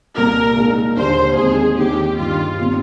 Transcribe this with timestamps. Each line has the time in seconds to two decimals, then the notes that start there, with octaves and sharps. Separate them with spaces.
0.16 C2 A#2 G3 A#3 A#4
0.57 A#2 G#3 D#4
0.97 D#2 D3 G3 C5
1.37 D#2 D#3 G#3 C4 D#4 G#4
1.77 D#2 D#3 G3 G4
2.18 G2 D#3 G3 F4
2.58 A#2 G3 C4 D#4